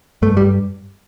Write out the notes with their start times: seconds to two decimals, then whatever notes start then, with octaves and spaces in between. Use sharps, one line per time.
0.22 G2 A3
0.37 G3